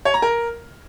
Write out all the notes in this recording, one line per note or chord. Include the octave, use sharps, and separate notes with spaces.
C#5
A#5
A#4